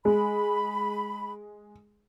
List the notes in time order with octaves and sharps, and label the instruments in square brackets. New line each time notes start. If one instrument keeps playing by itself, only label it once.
[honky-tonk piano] G#3 [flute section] B5